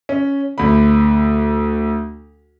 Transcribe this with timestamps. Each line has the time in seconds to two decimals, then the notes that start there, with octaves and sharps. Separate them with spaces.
0.09 C#4
0.58 D2 B5